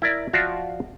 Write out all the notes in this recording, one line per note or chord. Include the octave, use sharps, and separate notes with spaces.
E4 A#4 D5
F3 F4 F#4 D5 E5 F5